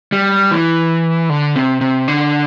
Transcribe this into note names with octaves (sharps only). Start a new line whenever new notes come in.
G3
E3
D3
C3
C3
D3